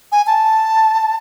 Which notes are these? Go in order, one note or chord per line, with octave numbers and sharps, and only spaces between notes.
G#5
A5